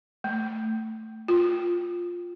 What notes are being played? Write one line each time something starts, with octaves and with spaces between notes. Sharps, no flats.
A3
F4